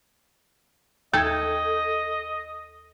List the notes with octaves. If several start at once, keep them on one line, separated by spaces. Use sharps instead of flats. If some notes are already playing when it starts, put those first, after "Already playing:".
D#2 A4 D#5 G#6